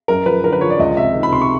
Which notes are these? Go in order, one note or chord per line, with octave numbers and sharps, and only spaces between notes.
F#2 A#4
F3 B4
D3 A#4
B4
F3 C#5
D5
C#2 D#5
C3 E5
D#3
B5
C3 C6
C#6